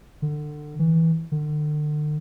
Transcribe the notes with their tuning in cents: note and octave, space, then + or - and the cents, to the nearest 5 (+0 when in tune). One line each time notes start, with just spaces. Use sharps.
D3 +25
E3 -15
D3 +40